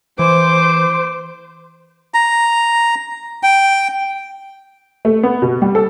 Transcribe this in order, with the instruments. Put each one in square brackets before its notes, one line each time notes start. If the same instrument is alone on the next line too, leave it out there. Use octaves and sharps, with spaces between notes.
[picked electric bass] E3 [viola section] C5 [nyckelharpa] D6
[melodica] A#5
G5
[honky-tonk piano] A3
B3
B2
G3
A4